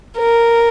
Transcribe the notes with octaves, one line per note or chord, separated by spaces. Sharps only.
A#4